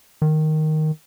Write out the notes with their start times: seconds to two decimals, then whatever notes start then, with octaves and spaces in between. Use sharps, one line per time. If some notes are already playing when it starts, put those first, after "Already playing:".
0.22 D#3